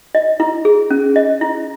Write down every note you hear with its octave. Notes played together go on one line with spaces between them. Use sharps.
D#5
E4
G#4
C#4
D#5
E4